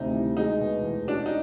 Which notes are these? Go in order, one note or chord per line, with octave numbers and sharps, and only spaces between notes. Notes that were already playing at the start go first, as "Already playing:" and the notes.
Already playing: D2 C3 D#3 D#4
C2
G#3 D#4
B2
E2
C#4 D4
D#4